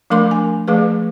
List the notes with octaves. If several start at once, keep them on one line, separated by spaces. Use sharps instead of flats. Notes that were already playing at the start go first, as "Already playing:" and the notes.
F3 A3 D4 A#4 C6 D6
G#5
F3 A3 G#4 B4